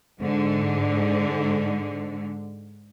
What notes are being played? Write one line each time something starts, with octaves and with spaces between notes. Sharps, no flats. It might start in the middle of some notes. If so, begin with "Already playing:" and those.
G#2 D3